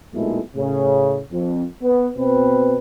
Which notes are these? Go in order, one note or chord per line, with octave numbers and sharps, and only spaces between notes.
B1 A#2 G#3 A3 D#4 E4
A2 C#3
F2
B3
B2 C4 B4